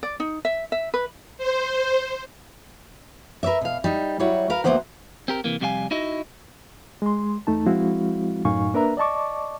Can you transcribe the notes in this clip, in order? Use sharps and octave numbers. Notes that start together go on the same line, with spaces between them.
D5
D#4
E5
E5
B4
C5
A#4 B4 C#5 D5 E5
B2 F5
G3 D#4
F#3 G3 E4 C#5 F#5
A#4 B4 F5
D2 D#3 A#3 B3 C5 F#5
C4 G4 A#4
C3 E3 A#3
F2 C3 G3 F#4 F5 G#5
D#4 E4 F#4 D#5
G#3 C6
E2 A3 D#4 A5
F3 G#3 C4 E4 F#4 F5
F#2 A2 D#4 F5 G#5 C#6
A#3 D4 A#4 B4 E5 A#5
D5 D#5 A5 C#6 D6